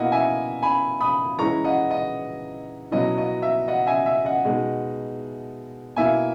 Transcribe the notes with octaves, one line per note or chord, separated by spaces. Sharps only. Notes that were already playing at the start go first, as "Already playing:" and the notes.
Already playing: B2 A#3 E4 D#5 F#5
E5 G#5
G#5 B5
B5 D#6
E3 G#3 C#4 E4 A#5 C#6
D#5 F#5
D#5
B2 F#3 C#4 E4 D#5
D#5
E5
D#5 F#5
E5 G#5
E5
D#5 F#5
B2 G#3 D#4
B2 A#3 E4 E5 G#5